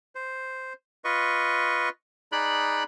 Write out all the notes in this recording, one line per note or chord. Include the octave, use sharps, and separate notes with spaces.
C5
F4 B4 D#5 C#6
D#4 G#4 D5 B5 F#6